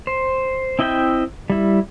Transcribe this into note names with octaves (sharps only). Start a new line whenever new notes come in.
C5
C4 E4 D#5 E5 G5
G3 E4